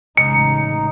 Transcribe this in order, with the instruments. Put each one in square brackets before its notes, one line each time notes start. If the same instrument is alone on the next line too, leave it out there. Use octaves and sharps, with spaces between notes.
[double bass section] A1 C#3 G#3 [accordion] D#4 [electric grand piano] C#7